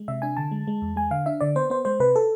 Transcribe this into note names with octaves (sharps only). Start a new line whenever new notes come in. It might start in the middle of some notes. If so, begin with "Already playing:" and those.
Already playing: G#3
C3 E5
D4 G#5
D3 A5
G#3
G#3
E2
G#3 G#5
D3 F5
D4 E5
D3 D5
B3 C5
B3 C5
G#3 C5
C3 B4
A4